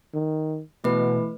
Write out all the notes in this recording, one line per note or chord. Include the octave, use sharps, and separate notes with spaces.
D#3
B2 E3 A3 B4